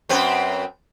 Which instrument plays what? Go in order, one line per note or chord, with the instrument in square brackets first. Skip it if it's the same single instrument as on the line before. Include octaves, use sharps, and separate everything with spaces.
[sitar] F#2 C4 B4